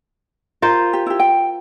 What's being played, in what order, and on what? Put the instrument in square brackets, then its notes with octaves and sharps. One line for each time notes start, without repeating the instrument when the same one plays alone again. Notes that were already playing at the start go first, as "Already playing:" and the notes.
[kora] F4 A#4 C5
[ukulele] G4
E4 G4
G5